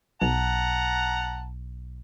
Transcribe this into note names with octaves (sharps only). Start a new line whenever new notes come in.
B1 F#5 A5 A#5